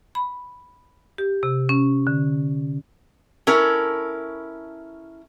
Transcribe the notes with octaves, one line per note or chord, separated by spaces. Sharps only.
B5
G4
C3
C#4
D3
C#4 E4 A4 A#4